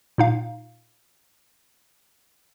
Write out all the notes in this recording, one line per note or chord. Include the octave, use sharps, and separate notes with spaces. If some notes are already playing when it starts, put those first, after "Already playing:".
A#2 D#4 F5